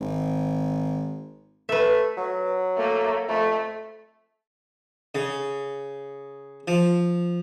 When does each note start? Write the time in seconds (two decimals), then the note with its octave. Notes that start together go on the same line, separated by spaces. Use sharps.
0.01 G#1
1.69 A3 B4 E5
2.17 F#3
2.77 A3 A#3
3.28 F2 A3
5.15 C#3
6.68 F3